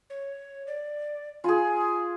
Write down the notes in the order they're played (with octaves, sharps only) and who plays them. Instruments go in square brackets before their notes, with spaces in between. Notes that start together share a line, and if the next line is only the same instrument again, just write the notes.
[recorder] C#5
D5
[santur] F4 G#4 [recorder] G#5